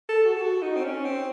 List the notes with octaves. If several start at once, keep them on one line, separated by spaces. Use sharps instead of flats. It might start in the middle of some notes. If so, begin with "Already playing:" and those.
A4
F#4
A4
F#4
D#4
C4
C#4
C4